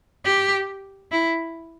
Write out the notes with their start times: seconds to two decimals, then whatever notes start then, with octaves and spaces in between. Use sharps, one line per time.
0.25 G4
1.11 E4